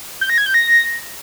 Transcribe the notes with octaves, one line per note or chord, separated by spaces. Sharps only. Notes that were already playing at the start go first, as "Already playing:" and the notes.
G6
A#6
G#6
G6
A#6